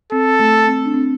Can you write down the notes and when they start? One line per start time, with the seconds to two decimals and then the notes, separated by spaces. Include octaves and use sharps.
0.12 C4 A4
0.40 A3
0.67 C4
0.86 D4
0.94 C4